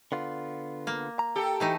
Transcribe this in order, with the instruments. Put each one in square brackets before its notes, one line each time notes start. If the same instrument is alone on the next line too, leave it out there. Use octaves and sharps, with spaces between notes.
[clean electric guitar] D3 B3 F4
[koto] A#3
[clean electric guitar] A#5
[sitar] G4 A4
[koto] E3 A3 D#4